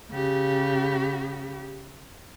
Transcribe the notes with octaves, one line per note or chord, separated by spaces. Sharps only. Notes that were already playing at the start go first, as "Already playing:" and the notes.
C#3 G4